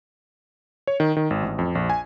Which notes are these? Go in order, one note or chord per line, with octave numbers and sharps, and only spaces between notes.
C#5
D#3
D#3
G#1
A1
F2
A#1
G#5